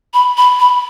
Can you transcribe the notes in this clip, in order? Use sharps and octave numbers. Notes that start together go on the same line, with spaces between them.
B5
B5
B5